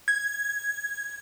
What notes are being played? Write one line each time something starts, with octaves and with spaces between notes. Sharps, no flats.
G#6